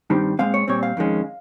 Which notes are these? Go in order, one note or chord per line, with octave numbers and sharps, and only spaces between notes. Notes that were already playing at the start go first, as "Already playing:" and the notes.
G2 D#3 G3 C4
A#2 G#3 C4 F5
C#5
A#2 G3 C4 C#5
F5
F2 D#3 G#3 C#4